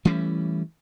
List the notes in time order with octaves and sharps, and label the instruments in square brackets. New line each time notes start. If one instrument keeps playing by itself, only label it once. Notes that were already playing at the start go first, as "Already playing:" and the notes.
[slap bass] E3 G3 A3 C#4